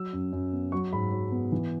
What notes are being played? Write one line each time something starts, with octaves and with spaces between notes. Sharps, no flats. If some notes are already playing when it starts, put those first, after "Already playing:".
Already playing: F#3 E6
F#2
F#2
B3
F#3 C#6
G#2 B5
F#3
B3
E3